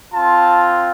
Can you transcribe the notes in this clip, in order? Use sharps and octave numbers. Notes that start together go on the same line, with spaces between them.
C4 F4 A5